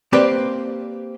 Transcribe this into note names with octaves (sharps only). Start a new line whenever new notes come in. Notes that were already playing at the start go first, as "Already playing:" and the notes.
A#3 C4 G4 B4 C5 D5